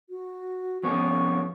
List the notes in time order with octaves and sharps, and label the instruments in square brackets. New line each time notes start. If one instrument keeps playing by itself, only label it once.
[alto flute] F#4
[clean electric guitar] F2 B3 C#4 [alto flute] C#6